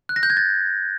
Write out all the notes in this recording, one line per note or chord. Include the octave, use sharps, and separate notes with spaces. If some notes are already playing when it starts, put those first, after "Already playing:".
F#6
A#6
G6
G#6
A6